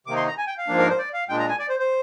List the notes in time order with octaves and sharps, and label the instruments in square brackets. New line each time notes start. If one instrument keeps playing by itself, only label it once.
[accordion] C3 D#3 A#3 D#4 D6
C6
A#5
G#5
G5
F5
G#2 F3 A#3 D4
A#4
C5
D5
F5
A#2 G#3 D4 G5
A#5
G#5
D5
C5
C5